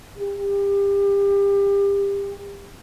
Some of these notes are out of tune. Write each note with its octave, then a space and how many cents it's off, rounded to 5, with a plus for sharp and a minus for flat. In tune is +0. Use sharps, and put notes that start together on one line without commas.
G4 +30